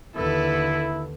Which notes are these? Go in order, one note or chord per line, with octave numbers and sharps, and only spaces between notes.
D#2 D3 E4 A4 B4